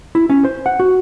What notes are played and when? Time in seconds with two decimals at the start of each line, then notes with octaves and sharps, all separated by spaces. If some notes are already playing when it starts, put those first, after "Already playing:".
0.15 E4
0.30 C#4
0.45 C5
0.66 F#5
0.80 F#4